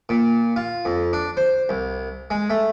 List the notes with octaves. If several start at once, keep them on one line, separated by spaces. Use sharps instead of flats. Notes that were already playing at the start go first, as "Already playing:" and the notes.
A#2
F4
F2
D4
C5
C2
G#3
A3